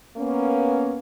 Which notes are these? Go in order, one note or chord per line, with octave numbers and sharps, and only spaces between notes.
A#3 B3 C#4